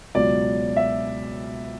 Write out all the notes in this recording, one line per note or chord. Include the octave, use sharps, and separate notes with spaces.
C#2 B2 F#3 D5
E5